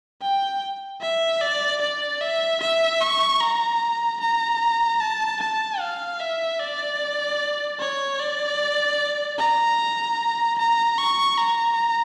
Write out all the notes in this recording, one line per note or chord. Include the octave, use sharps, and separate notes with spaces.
G5
E5
D5
D5
E5
E5
C#6
A#5
A#5
A5
A5
F5
E5
D5
C#5
D5
A#5
A#5
C#6
A#5